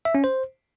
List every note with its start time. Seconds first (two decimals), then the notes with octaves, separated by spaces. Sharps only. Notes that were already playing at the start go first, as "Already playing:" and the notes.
0.05 E5
0.15 C#4
0.24 C5